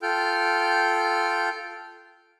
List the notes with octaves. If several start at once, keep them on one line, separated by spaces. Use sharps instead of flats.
F4 A4 G5 F6 G6